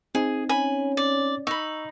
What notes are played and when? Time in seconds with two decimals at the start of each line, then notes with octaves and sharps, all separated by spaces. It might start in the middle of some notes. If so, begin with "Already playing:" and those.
0.15 C4 D#4 G#4
0.49 C#4 G#5 B5
0.97 D5
1.47 D#4 B5 C#6 E6